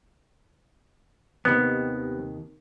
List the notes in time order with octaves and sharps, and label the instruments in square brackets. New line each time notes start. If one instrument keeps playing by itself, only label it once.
[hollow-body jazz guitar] D#2 C3 D#3 [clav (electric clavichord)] B3